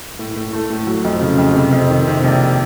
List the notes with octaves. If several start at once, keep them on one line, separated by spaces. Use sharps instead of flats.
A2
A2
A3
A2
F#3
F2
C#3
F2
C3
F2
D#3
C3
A#1